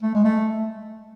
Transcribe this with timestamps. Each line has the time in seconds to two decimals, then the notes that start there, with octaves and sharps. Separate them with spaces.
0.03 A3
0.15 G#3
0.25 A3